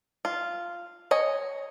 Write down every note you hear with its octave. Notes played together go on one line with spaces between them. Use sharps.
F4
C#5 D#5 G#5